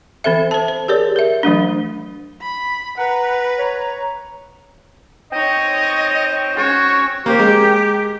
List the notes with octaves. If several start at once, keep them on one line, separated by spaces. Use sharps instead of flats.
E3 C4 A4 C5 E5
C5 A5
C5
G4 G#4 A#4 C#5 D5
A#4 E5
E3 F#3 A3 D4
B5
B4 F#5 A#5
C#5
C4 D#4 C#5 D#5
C4 C#4 F#4 C#5
A#3 G4 C5
G#3 A#4